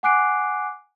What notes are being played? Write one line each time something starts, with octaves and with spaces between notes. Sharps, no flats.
F#5 G#5 D6 F#6 C7 D7